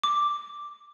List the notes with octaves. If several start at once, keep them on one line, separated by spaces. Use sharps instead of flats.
D6